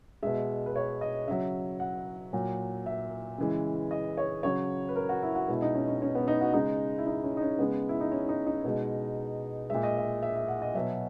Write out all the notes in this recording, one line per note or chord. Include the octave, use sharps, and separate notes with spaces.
B2 G#3 E5
B4
C#5
D#5
C#3 F#3 E5
F#5
A#2 F#3
E5
C#3 E3 G#3
D#5
C#5
C#3 F#3 C#5
B4
A#4
F#4
E4
F#4
B2 G#3 E4
D#4
C#4
C#4
C#4
B3
D#4
F#4
C#3 G#3 D#4
E4
D#4
C#4
D#4
C#4
C#3 G#3 B3
E4
D#4
C#4
D#4
D#4
B2 G#3
A#2 G#3 E5
D#5
E5
E5
E5
F#5
D#5
B2 F#3 E5